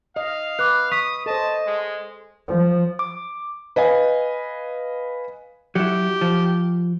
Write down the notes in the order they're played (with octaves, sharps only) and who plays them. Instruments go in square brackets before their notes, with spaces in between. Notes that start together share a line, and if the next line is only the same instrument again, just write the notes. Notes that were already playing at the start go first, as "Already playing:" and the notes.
[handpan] D#5 [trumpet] F5
[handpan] B4 [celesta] D6 F#6
[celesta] C#6 B6 [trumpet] D#6
[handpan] A4 C5 [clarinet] D#5 [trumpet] A5
[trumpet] G#3
[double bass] F3
[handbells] D6
[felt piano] B4 D#5 F5 G#5
[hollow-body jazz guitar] F#3 E4 [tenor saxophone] G4
[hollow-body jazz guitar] F3